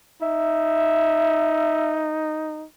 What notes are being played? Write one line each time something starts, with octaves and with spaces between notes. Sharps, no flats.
D#4 E5